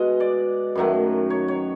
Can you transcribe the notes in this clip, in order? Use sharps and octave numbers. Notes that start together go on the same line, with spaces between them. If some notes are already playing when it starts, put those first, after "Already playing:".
Already playing: B2 G#3 D#5
D5
F#2 D#3 F#3 A3
C#5
C#5